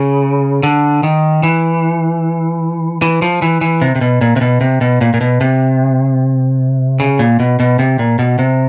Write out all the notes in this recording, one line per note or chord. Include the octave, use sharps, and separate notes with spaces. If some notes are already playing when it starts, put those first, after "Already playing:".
Already playing: C#3
D3
D#3
E3
E3
F3
E3
E3
C3
C3
B2
A#2
C3
B2
C3
B2
A#2
A#2
B2
C3
C#3
A#2
B2
B2
C3
A#2
B2
C3